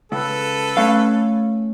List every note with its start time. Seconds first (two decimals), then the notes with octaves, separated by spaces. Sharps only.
0.12 C#2 A4 B4
0.77 A3 C#4 F5